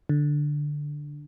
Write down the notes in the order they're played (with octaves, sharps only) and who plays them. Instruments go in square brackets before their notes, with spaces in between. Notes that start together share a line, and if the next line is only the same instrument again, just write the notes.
[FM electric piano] D3